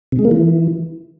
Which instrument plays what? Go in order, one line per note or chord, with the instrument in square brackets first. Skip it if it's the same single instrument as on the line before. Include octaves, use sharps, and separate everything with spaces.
[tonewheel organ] C3
G#3
A#3
E3